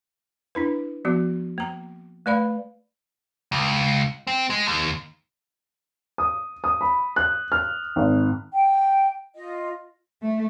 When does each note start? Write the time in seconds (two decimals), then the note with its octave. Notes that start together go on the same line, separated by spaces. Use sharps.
0.55 D4 E4 B4
1.05 F3 B3 F#4
1.58 A#3 A#5
2.26 A3 B4 D5 F5 B5
3.52 C#2
4.27 C4
4.50 G#3
4.67 D#2
6.18 D#6
6.64 D#6
6.81 B5
7.16 F#6
7.52 F6
7.96 G#1
8.52 G5
9.35 F4 D#5
10.21 A3